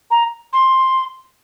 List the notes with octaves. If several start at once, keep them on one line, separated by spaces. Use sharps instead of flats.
A#5
C6